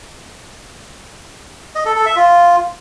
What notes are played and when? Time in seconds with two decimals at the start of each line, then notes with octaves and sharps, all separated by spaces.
1.75 D#5
1.86 A4
1.96 A4
2.06 E5
2.16 F4